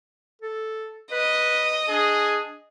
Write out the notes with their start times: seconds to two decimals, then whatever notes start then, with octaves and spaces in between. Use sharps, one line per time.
0.42 A4
1.12 B4 D#5
1.88 D4 G#4